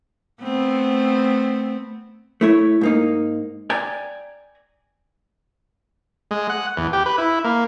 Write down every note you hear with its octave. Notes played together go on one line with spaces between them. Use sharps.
A3 B3 C4
A3 E4 C#5
G#2 A#3 D#4
D5 G5 G#5 A#5
G#3
F#5
E2
G4
B4
E4
A#3